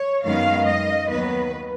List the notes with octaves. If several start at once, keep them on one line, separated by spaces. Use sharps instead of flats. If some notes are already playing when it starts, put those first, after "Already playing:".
Already playing: C#5
F#2 D#3 G#3 B3 F5
D#5
D#2 D#3 F#3 B3 B4